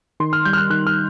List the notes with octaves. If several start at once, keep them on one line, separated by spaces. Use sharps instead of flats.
D#3 C6
F6
G3 G6
F6
F#6
D#3 F#6
F6